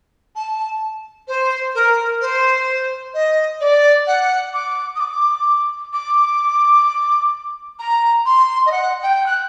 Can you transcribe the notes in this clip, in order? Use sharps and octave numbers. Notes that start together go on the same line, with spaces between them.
A5
C5
A#4
C5
D#5
D5
F#5
D6
D#6
D6
D6
A#5
C6
D#5
F#5
G5
F#6